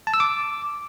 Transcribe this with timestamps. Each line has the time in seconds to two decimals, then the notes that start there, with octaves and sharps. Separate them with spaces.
0.07 A5
0.14 E6
0.20 D6